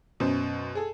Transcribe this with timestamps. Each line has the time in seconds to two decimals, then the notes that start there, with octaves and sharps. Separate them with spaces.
0.20 F#2 B2 C5
0.75 G#4 A4